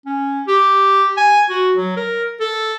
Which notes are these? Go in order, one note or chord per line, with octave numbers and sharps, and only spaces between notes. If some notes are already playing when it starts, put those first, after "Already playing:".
C#4
G4
G#5
F#4
F#3
A#4
A4